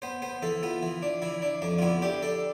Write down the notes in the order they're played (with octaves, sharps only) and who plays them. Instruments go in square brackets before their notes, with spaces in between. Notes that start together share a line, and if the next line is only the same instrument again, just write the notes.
[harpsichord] B3 C5
B3 C5
E3 A4
B3 F4
E3
D4
E3 E4
D4
F2 D4
F4
B3 E4
D4 G4
D4 A4